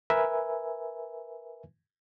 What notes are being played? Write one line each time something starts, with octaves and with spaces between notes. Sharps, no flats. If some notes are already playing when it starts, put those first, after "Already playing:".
A#4 B4 E5 G#5